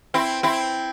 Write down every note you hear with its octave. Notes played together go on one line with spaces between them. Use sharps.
C4 E4
C4 E4